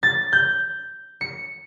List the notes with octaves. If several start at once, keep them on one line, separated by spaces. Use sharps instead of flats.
A6
G6
C#7